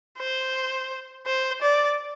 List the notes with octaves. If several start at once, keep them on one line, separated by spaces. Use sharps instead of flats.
C5
C5
D5